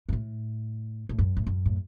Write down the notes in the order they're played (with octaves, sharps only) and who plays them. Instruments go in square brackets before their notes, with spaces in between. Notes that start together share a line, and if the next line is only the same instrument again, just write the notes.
[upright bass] F#2
A2
A2
F#2
A2
F#2
A2